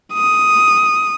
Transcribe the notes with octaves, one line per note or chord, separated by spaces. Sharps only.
D#6